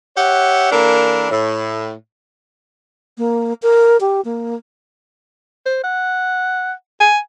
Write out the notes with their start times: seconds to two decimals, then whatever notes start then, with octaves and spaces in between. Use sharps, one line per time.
0.17 G4 C#5 E5 F#5
0.72 E3 A#3 D4 A4 A#4
1.31 A2
3.18 A#3
3.62 A#4
4.00 G4
4.25 A#3
5.66 C5
5.84 F#5
7.00 G#5